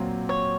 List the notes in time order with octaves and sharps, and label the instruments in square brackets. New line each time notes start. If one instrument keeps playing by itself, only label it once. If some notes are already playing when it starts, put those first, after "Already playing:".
Already playing: [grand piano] A#2 F#3 C4 F4
[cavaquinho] C#5